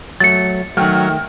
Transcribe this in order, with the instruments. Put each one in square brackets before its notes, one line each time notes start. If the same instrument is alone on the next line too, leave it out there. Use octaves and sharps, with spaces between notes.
[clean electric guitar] F#3 A3 [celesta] A6 C#7
[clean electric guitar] D#3 A3 [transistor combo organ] F#3 [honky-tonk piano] G5 F6